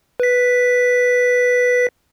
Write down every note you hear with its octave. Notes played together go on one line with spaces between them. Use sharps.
B4 B6